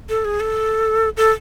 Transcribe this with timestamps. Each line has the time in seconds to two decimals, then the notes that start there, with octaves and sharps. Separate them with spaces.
0.09 A4
0.25 G#4
0.40 A4
1.17 A4